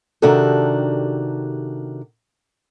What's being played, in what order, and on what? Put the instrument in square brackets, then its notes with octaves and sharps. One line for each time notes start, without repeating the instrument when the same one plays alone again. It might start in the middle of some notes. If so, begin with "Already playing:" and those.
[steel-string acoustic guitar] C3 D#3 D4 F#4 G4 A4